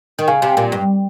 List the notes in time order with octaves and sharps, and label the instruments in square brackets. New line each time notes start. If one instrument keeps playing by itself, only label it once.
[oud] D#3
[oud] C#3 [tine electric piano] F5 G#5
[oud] C3
A#2
G2